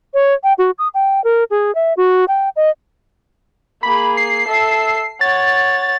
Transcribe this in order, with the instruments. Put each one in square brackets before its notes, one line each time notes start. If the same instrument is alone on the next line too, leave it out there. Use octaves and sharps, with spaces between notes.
[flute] C#5
G5
F#4
D#6
G5
A#4
G#4
E5
F#4
G5
D#5
[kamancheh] A#3 G#4 [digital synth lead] B5
[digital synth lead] C7
[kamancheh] A4 E5
[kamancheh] C#5 F#5 [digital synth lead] A6